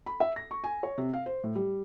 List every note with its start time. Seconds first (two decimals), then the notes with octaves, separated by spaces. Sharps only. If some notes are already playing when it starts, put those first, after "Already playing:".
0.06 B5
0.20 E5
0.36 A#6
0.51 C#6
0.64 G#5
0.83 C#5
0.98 C3
1.13 F5
1.26 C5
1.44 A2
1.55 G3